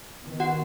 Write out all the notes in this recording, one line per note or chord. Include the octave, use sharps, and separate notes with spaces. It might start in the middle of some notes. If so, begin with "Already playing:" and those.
D#3 B3
F#4 F#5